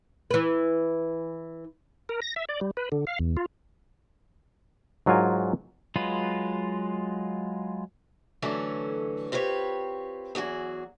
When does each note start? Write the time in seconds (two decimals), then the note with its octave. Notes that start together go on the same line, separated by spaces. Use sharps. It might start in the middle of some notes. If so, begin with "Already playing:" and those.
0.31 E3 B4
2.09 A#4
2.22 A#6
2.36 E5
2.49 D5
2.61 G3
2.77 B4
2.92 D3
3.07 F5
3.19 E2
3.37 F4
5.06 G#2 F#3 D4 F4 A#4 G#5
5.96 F#3 G#3 F4 B4
8.42 D3 E3 F#3 A3 C#4
9.32 C4 F4 G4 B4 C#5
10.35 E2 F#3 F#4 G#4